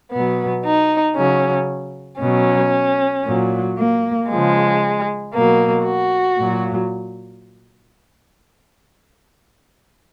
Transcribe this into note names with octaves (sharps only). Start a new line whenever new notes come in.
B2 F#3 B3
D#4
C#3 F#3 C#4
B2 F#3 C#4
A#2 F#3
A#3
C#3 F3 G#3
B2 F#3 A#3
F#4
A#2 F#3